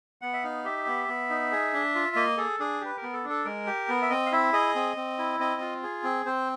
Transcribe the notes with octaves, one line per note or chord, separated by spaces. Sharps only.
B3 F#5
E5
D#4 F5
G4 E5
B3
B3
D#4
G#4
D4
F4
A#3 D#5
G#4 A4
D4 G#4
G4 B4
A#4
B3
A4
D4
A4
G#3 A#4
G4
B3
E5
C4 D#5
F5
E4 E5
G#4 D#5
C4
C4
E4
C4 D#5
F4
G#4
C4
C4 C5